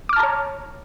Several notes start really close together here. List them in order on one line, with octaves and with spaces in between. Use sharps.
D6 F6 A5 A#5 C#5